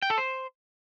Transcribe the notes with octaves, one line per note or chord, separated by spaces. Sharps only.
G5
A4
C5